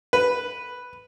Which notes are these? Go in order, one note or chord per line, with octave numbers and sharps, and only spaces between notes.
B4